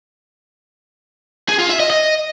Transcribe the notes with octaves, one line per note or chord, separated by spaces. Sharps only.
G#4
F4
E5
D#5
D#5